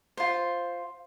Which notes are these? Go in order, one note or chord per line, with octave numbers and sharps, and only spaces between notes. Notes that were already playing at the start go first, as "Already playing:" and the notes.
F4 C5